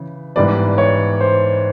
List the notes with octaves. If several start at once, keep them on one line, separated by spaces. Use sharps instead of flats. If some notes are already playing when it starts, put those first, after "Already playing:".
Already playing: C#3 E3
G#2 E3 G3 B3 D5
C#5
C5